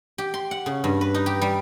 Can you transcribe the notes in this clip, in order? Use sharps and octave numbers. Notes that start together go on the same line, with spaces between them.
G4
C6
F#5
C#3
G2
B4
D#4
G4
G3